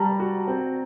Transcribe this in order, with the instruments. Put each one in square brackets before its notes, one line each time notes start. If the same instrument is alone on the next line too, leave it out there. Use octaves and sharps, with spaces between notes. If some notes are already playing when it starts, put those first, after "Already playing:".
Already playing: [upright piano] G3 [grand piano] A5 A#5
[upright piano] F#4
C4